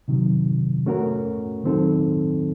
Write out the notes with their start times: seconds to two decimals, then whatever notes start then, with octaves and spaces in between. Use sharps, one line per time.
0.08 C3 D#3 F#3
0.86 A3 C#4 F#4 A#4
1.64 D#3 F#3 C4 D#4 A4